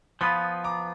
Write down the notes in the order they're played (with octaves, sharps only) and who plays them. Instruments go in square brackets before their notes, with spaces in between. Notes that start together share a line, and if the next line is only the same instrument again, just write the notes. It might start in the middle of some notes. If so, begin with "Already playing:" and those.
[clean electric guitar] F3 B3 F4 B4 [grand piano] B5 D#6
[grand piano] A#5 D6